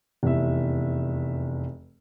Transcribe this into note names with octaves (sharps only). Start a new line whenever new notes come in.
F1 E2 E5